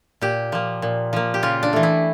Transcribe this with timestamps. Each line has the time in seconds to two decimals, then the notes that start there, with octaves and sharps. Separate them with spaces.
0.21 A#2 G4
0.52 F3 A#3
0.82 A#2
1.13 F3 A#3
1.34 G4
1.42 C#3 F4
1.63 D4
1.73 E3 A3
1.83 E4